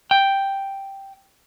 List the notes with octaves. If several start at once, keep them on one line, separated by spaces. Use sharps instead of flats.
G5